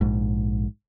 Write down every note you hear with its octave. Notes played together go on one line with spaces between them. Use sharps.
A#1 G#2